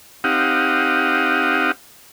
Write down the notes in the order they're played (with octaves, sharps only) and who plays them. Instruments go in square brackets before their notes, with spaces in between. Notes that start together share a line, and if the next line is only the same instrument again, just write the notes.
[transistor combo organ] C4 D#4 G4 F5 F#5 D#6